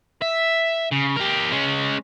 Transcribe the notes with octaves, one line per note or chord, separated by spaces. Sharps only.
E5
C#3
G4 A#4
G#3 C#4